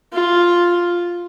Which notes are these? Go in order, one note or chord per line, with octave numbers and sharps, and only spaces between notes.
F4